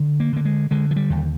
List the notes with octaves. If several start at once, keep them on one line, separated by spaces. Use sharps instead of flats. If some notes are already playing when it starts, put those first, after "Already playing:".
Already playing: D3
A#3
D3 A#3
G#3
D3 G#3
F3
G3
D#2